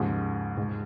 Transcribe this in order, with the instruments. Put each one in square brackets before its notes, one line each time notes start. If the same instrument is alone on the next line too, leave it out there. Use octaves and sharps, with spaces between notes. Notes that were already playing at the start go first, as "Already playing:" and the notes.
Already playing: [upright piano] D#2 C#3 F3 [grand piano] G#2
[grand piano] G#2